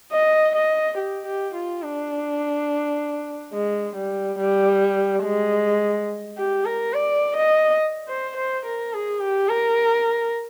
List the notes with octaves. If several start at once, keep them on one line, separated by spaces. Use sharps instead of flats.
D#5
D#5
G4
G4
F4
D4
G#3
G3
G3
G#3
G4
A#4
D5
D#5
C5
C5
A#4
G#4
G4
A#4